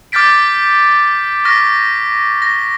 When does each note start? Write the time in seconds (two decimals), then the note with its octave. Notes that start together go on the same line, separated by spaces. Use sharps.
0.12 D6 F6 G6 A6 B6 D7
1.45 C#6 F6 A#6 B6
2.42 A#6